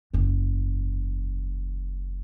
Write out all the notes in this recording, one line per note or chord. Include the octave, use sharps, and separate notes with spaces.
F#1 E2